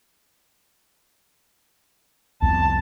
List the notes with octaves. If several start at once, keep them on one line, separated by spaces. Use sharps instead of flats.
C2 F2 B3 A5